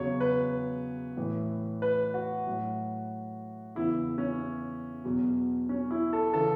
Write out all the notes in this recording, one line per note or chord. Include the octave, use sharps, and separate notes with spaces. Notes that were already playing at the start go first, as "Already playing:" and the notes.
Already playing: E2 C#3 F#3 C#5
B4
A2 E3
B4
F#4
A2 F#3
E2 C#3 E3 E4
C#4
E2 B2 F#3
C#4
E4
A4
C#3 E3 A4